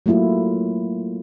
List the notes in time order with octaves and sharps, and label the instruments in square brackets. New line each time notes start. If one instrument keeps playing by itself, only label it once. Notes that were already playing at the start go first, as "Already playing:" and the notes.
[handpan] F#3 A3 A#3 E4 F4